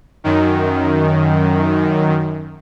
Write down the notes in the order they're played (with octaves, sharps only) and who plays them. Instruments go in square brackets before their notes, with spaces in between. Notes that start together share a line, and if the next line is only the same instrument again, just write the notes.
[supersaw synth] F#2 D#3